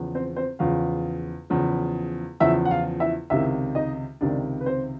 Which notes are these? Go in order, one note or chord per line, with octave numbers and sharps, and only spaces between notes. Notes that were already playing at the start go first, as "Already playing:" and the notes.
Already playing: E2 C#3 F3
C4 C5
C4 C5
E2 C#3 F3 F4 F5
E2 C#3 F3
E2 C#3 F3 E4 E5
F#5
F4 F5
E4 E5
C#2 C3 D#3 E4 E5
D#4 D#5
C#2 C3 D#3 D4 D5
B4
C4 C5